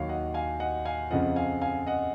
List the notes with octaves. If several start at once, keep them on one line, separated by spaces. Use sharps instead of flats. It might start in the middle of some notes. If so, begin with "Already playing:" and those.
Already playing: D#2 D#3 F#3 C#5 F5
D#5 F#5
F5 G#5
D#5 F#5
F5 G#5
F2 C#3 F3 D#5 F#5
F5 G#5
F5 G#5
D#5 F#5